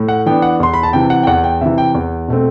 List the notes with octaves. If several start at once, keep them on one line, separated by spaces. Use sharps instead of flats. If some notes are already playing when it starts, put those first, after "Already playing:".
Already playing: A2
F#5
E3 B3 D4 G5
F#5
E2 C6
B5
A5
C3 E3 G5
F#5
G5
E2 F#5
G5
C3 E3 E5
G5
E2
B2 A3 C4